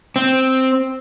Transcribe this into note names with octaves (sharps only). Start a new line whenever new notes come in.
C4